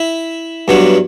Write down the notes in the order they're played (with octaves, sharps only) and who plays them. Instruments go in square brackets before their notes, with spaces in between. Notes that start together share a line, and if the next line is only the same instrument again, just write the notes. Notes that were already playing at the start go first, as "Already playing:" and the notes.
Already playing: [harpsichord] E4 E5
G2 F#3 B3 D4